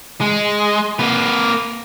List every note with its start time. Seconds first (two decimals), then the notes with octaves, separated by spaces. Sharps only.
0.21 G#3
0.99 A#3 B4